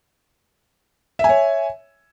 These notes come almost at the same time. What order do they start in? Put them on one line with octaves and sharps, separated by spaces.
E5 G#5 C#5